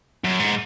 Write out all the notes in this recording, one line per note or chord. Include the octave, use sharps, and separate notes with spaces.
F#2
G#2